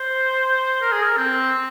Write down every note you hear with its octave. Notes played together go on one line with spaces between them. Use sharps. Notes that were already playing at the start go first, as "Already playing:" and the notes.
Already playing: C5
A#4
G#4
A#4
C4